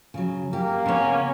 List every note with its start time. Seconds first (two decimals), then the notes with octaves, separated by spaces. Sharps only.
0.14 C#3 F#3
0.53 A#3 G4
0.86 C#3 B3 C#4